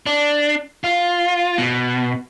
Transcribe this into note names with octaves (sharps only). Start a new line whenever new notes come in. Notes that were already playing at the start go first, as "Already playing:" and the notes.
D4
F4
B2